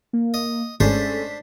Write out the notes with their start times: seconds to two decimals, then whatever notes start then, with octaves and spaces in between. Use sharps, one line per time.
0.13 A#3
0.34 D#5
0.80 G#1 G#3 A3 C#4 D4 C5 A5 B6